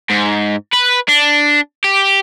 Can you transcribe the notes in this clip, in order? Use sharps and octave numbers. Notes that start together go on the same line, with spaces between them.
G#2
B4
D4
G4